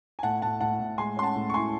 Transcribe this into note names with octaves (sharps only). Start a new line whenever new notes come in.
G#5
A2 F#5 A5
A2 F#5 A5
A2 F#5 A5
A2
G#3 G#5 C6
C#4 C6
F#5 A5
A2
C#6
E4 G#5 C6